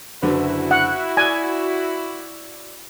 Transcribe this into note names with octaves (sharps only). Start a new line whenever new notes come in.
F#1 D3 E4 F#4 B4
F#5
D5 G#5 F#6